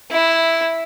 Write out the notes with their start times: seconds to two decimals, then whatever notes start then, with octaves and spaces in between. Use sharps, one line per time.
0.11 E4